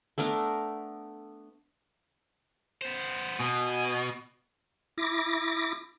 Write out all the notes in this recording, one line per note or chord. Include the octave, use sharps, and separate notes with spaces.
A3 B3 D4 A#4
B3 C5
B2 G#5
E4 D6 A#6